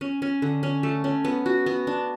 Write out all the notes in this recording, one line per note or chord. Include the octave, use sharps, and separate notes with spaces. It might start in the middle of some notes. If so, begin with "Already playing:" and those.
C#4
C#4
D3
C#4
A3
C#4
B3
F#4
B3
D4